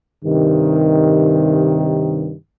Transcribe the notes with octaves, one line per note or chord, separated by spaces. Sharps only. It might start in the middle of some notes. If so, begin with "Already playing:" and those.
G2 C3 D#3